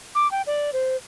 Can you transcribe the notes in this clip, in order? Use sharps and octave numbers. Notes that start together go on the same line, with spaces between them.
D6
G5
D5
C5